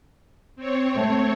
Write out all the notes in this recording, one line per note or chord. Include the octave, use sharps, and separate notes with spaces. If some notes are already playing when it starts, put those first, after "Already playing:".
C4 C#5
A3